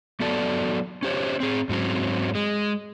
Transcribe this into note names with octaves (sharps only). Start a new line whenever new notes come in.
F#3 B3 F#4 A4 D5 A5
C#4 G4 C5 C#5
C4 G#4
G#2 F#3 C4 C#4
G#3